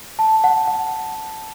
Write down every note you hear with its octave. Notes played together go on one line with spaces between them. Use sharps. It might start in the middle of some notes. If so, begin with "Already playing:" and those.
A5
F#5
F#5